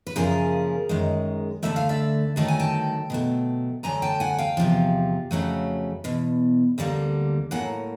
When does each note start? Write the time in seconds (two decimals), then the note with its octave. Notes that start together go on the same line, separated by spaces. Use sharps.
0.07 B4
0.16 F#2 C#3 F3 A#3 G#4 A#4
0.89 F#2 D#3 G#3
1.63 D2 D3 F#3 A3 E5
1.76 F5
1.89 D5 E5
2.36 G2 D#3 F#3 A3 A5
2.48 G#5
2.59 G5 A5
3.10 B2 F#3 A3
3.83 D2 D3 F#3 G#5 A#5
4.02 G5 A5
4.20 F#5 G#5
4.38 F5 G5
4.57 E2 C3 F3
5.31 F2 C#3 F#3 A3
6.04 E2 B2
6.78 D2 D3 G3 A#3
7.51 A2 F#3 A#3 F#5 G#5